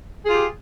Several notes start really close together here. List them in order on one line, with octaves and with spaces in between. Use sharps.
G#4 F4 G4